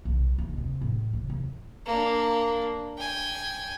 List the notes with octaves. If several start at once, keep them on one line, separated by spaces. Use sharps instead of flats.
B1
D#2
C3
A2
C3
D#2
A#3 D4
G5 G#5